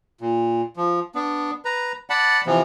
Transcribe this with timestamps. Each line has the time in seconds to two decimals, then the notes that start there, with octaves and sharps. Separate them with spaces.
0.21 A#2
0.77 F3
1.15 B3 D4
1.65 B4 A#5
2.10 D5 F#5 A5 B5
2.46 C3 E3 F3 B3